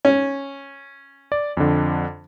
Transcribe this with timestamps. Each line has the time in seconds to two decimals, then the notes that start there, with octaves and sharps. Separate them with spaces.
0.05 C#4
1.32 D5
1.57 F2 D3